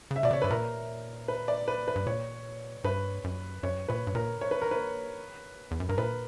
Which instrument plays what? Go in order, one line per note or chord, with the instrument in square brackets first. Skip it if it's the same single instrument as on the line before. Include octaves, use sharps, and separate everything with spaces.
[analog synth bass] C#3
[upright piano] E5
[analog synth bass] B2 [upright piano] D5
[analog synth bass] C#3 [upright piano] C#5
[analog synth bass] G2 [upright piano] B4
[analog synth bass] A#2 [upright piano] A#4
[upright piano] B4
D5
B4
B4
[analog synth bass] G2
[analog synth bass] A#2 [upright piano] C#5
[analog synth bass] G2 [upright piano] B4
[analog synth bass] F#2
[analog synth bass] F#2 [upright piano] C#5
[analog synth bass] A#2 [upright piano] B4
[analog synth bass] G2
[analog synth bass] A#2 [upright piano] A#4
[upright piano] C#5
B4
A#4
B4
[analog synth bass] E2
F#2
[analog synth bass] G2 [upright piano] A#4
[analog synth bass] A#2 [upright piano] B4